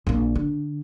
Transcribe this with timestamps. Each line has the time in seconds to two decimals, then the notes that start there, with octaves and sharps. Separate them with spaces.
0.07 A#1 A#3
0.35 D3